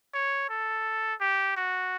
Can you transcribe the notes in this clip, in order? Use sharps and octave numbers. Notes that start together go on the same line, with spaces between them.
C#5
A4
G4
F#4